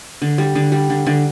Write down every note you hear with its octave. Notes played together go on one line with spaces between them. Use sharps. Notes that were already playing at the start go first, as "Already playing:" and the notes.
D3
G3
D3
G3
D3
D3